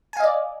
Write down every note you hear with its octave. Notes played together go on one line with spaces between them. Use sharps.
D5 D#5 F5 G#5